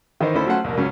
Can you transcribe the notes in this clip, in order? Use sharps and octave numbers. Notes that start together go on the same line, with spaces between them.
D#3 E3 D#4 C5
D2 C#4 E4 A4 C5 B5
F#3 A3 C#4 C5 F#5 C6
C2 F2 A#2 A#3
C#2 F#3 C#4